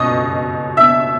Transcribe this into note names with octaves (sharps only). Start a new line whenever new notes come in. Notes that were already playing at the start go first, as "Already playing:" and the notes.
Already playing: C#2 B2 D#5 C#6 D#6
E5 E6